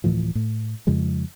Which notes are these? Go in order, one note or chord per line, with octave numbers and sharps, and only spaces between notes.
D1 A2 E3 F3
A2
F2 C#3 F3 G#3